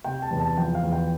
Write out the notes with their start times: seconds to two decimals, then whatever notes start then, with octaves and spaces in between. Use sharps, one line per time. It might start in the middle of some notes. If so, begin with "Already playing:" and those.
0.04 C3 G5
0.22 A5
0.31 E2
0.40 A5
0.57 F3 G5
0.75 F5
0.83 E2
0.92 G5